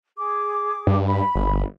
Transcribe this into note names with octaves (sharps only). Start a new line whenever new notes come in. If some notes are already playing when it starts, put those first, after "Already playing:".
G#4 D6
G2
B5
G1